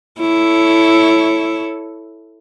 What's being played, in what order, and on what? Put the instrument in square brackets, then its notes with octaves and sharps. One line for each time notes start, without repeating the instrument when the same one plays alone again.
[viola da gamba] E4 A4 C#5